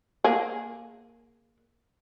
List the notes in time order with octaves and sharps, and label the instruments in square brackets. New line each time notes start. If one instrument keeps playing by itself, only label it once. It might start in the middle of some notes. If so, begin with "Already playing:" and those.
[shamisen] A#3 G#4